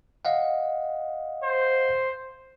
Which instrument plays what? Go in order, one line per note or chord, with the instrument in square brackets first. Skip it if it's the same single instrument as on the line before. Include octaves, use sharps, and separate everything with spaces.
[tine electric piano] D#5 F5 F#5
[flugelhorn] C5